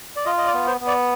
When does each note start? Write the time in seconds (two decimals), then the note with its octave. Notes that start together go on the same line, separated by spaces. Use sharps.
0.16 D5
0.25 F4 D#5
0.38 D#5
0.47 D5
0.53 B3
0.67 C5
0.81 B3
0.87 D5